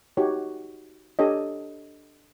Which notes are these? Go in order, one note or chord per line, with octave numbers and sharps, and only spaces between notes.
D#4 F#4 G4 C#5
D4 G4 A4 C#5 D#5